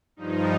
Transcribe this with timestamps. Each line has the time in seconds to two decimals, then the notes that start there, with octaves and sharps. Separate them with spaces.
0.16 G2 F3 D#4